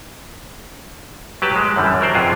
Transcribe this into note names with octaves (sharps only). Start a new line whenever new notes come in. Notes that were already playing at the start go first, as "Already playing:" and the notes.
F#3 G4 B4 A5
G#3
F#2 D3 E3 G3
F#3 A#4 C5 D5
F2 C3 B3 F4 G#4